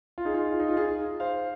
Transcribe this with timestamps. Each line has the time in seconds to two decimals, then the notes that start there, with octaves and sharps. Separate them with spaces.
0.18 F4
0.25 D#4 G#4
0.34 F4
0.52 F4
0.60 D#4
0.69 F4
0.77 D#4 G#4
1.20 C5 F5